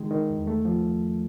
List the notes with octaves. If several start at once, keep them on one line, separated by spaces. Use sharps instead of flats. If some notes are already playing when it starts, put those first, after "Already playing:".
Already playing: D#3 G#3
D#3
E2
A3
F3